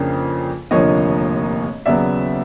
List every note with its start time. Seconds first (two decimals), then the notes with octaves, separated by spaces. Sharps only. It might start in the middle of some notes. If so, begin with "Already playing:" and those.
Already playing: F2 C#3 F3 A#3 D4
0.71 F1 D#2 D3 F3 A#3 C#5 D#5
1.86 D#2 C#3 F#3 B3 D5 E5